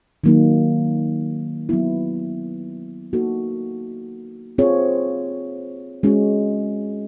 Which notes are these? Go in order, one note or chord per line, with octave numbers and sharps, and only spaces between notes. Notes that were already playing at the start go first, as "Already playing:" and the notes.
D#3 F#3 A#3 D#4
F#3 B3 E4
A#3 D#4 F#4 A4
C4 F4 G#4 C#5
G#3 C#4 F#4